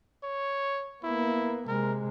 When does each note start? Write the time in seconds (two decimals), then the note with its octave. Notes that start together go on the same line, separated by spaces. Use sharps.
0.23 C#5
1.03 A#3 B3 E4
1.68 C3 G#3 A#4